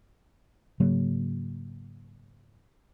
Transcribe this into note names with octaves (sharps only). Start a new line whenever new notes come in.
G#2 C#3 F#3 A#3